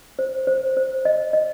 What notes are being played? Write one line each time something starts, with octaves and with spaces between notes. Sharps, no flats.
C5
C5
C5
D#5
D#5